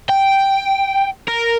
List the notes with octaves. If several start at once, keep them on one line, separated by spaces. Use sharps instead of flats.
G5
A#4